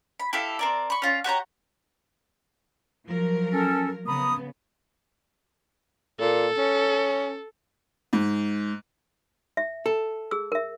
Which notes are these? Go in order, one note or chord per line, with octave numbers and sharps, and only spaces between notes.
B5
E4 G4 A4 F5
C4 A#4 D5
B5 C#6
C#4 F4
F#4 G4 C#5 A#5
F3 F#3 A#4
C#4 A4
C#3 B3 A#5 B5 D#6
A#2 A4
C#4
G#2
E5
A4
G#4 E6
A#4 E5